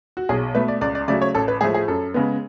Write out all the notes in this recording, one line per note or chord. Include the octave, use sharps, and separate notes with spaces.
F#4
B1 G#4
B2 A3 B4
D5
C#2 D5
D5
C#3 F#3 A3 D5
C#5
A1 A4
B4
A2 F3 A3 G#4
G#4
F#2 A4
C#3 G#3 B3